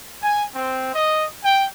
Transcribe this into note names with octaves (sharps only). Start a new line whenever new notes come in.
G#5
C4
D#5
G5